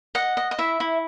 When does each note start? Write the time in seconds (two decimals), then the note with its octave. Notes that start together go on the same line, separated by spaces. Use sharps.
0.15 D#5 F#5
0.37 D#5
0.51 D#5
0.59 E4 E5
0.80 E4